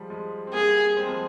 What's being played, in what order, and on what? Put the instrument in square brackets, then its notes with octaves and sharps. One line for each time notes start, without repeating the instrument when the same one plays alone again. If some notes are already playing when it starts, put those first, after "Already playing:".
Already playing: [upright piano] F3 G3 G#3
F3 G#3
C4
[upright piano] G3 A#3 [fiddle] G#4
[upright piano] G#3 C4
F3 G#3